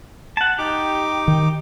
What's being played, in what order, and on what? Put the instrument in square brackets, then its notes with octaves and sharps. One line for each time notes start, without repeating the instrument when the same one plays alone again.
[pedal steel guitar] F#5 A5
[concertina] D#4 D6 [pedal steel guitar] G4
[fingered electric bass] D#3